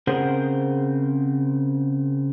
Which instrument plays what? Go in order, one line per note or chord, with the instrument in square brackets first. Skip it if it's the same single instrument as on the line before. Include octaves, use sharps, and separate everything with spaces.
[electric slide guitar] C#3 C4 G#4 A#4 C5 F#5